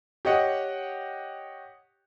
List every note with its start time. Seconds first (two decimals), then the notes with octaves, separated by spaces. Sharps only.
0.25 G4 C#5 D#5 F#5